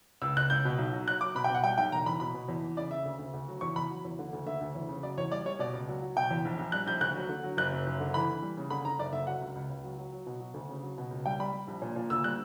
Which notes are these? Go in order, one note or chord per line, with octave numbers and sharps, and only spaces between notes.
C#2 E6
C#2 F#6
C#2 G6
B2
B1
F#3
F#3 F#6
F#3 D6
B2 B5
G5
B2 F#5
G3 G5
B1 G5
E1 A#5
E2 B5
B2 B5
B2
E2
E3
C#3 D5
C#3 E5
D2
D2
D2
F#3
E2 C#6
E2 B5
F#3
E2
D3
D2
D3 E5
D2
E2
C#3
F#3 D5
E2 C#5
G3 D5
G3 C#5
B2 D5
C#2
F#3
F#3
B2 G5
E2
A#1
A#1
G3 F#6
A#1 G6
D2 F#6
F#3
D3
F#3
F#1 F#6
F#2
F#1
D3
E3 B5
E3
G3
C#3
D3 B5
D3 A#5
F#1 D5
D3 E5
F#3 F#5
C#2
C#2
C#2
F#3
F#3
F#3
B2
F#3
D2
C#3
F#3
B2
C#2
G3 G5
G3 B5
G3
A#1
A#2
A#2
D2 E6
G3 F#6